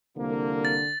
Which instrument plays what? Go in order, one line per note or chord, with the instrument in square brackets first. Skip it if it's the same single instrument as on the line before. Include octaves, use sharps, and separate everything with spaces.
[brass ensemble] C2 F3 A#3 [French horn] D3
[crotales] A6